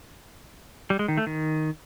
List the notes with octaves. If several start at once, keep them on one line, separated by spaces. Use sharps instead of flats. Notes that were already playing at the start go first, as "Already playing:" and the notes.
G3
G#3
D#3
A3
D#3